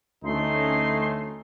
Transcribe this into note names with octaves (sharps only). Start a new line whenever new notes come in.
D2 A3 C#4 D#4 C6